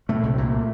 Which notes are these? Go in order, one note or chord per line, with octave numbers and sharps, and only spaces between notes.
A#2 A3
C2
A#2